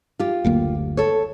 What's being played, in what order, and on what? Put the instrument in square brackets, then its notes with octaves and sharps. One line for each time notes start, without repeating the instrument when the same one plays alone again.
[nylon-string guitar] F4 G4
[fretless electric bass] F#1 D2 A#3
[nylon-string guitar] A4 C#5